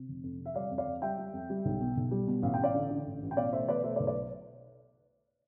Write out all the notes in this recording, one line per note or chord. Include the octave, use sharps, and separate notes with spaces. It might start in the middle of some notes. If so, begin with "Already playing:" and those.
Already playing: C3
F1
F2
C3
E5
G3 D5 F5
F2
D5 F5
F2
G3 E5 G5
G3
F2
G3
B1
B2
B1
G3
B2
A1 F5
A1 G5
D5 F5
D3
D3
A1
A1
G5
B2 D5 F5
A3 C5 E5
B2 B4 D5
A3 C5 E5
B4 D5
B1
B4 D5